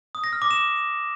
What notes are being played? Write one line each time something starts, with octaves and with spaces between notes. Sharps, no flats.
D#6
A#6
F6
D6
E7